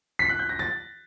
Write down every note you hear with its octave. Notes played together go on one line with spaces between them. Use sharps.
B6
F#6
G6
A#6
A6